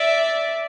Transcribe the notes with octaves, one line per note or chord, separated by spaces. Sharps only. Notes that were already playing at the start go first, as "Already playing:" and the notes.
Already playing: D5 E5